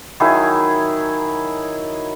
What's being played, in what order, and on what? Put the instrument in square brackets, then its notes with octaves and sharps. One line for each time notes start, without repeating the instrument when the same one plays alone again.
[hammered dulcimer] D#3 F#3 E4 G#4